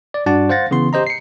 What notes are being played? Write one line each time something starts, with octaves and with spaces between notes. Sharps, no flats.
D5
G2 D4 F#4 D5 F#5 A5
C5 F5 F#5 A6 A#6
C#3 E3 B3 C6
G4 C5 D#5 A#5
C7 C#7